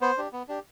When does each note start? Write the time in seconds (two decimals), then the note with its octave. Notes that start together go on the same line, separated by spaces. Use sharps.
0.01 B3 C5
0.17 D4 G4
0.33 B3
0.48 D4 G4